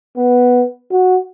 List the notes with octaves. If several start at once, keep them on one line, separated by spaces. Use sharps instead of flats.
B3
F#4